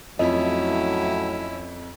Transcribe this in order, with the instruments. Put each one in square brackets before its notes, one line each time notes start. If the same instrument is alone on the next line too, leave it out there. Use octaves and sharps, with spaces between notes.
[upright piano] F2 [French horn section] A2 F#3 [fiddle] C#4 E4 [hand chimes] D#5